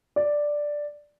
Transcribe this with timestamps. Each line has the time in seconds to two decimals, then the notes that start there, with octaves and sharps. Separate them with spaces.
0.16 D5